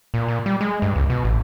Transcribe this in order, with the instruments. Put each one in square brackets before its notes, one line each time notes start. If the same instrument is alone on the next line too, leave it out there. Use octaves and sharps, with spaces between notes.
[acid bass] A#2
A#2
G3
G#3
G2
C#2
B2
A1